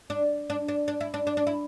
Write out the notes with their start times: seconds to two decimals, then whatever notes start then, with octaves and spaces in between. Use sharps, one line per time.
0.10 D4
0.50 D4
0.68 D4
0.88 D4
1.01 E4
1.14 D4
1.27 D4
1.37 D4
1.47 E4